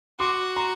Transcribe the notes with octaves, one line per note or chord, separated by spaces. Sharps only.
F#4 C6 D6
A#5 C6